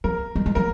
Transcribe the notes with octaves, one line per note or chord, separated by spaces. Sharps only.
F3 A#4
G#3
G#3
F3 A#4